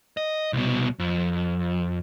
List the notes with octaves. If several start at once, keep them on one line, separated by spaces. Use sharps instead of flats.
D#5
C2 B2
F2